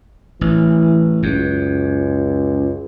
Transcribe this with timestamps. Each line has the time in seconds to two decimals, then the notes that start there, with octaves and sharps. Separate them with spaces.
0.41 A1 E3
1.23 C#2 F#2